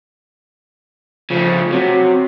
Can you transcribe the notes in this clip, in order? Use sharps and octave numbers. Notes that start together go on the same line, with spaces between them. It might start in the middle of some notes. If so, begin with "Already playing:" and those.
C#3 F3 A3
C3 F#3